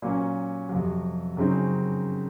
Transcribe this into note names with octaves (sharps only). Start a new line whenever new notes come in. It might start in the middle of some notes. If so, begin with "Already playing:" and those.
A#2 F#3 A#3 C#4
F2 C3 F#3
F#2 C#3 F#3 C4 D#4